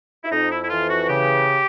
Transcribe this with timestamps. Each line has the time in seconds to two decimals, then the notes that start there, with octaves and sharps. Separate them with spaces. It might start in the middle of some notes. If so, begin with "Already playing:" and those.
0.24 E4
0.32 F2 D#4
0.52 E4
0.63 E4
0.70 E3 F4
0.90 F#4
1.09 C#3 G4